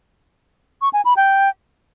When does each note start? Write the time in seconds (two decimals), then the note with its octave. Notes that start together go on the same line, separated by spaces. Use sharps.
0.82 C#6
0.93 G#5
1.05 B5
1.17 G5